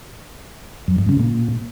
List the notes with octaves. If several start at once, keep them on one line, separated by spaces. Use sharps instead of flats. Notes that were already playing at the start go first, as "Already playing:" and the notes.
F#2
G2
C#3
A#2